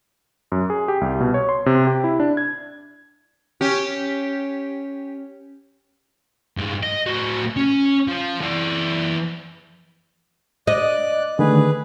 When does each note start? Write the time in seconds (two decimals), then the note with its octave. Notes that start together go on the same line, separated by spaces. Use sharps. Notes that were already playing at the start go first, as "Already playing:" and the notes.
0.52 F#2
0.70 G#4
0.88 G4
1.01 C2
1.21 B2
1.34 C#5
1.49 C6
1.66 C3
1.87 G4
2.04 E4
2.20 D4
2.37 G#6
3.61 C#4 G4
6.57 G2 G#3
6.83 D#5
7.07 A2 F#4
7.57 C#4
8.08 F3
8.41 E3 D5
10.67 D5 D#5 F#6
11.39 D3 D#3 A3 G#4 B4